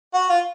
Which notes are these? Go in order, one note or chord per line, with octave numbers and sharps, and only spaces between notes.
F#4
F4